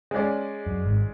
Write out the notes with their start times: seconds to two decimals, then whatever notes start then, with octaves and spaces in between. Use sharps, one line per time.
0.11 G#3 C#4 G#4 D5
0.66 F#2
0.86 G#1 G#2